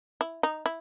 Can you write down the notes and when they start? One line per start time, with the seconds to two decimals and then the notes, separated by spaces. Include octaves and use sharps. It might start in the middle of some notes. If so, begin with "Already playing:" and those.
0.21 E4
0.43 D#4
0.66 E4